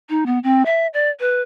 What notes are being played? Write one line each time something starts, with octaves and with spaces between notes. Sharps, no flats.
D#4
B3
C4
E5
D5
B4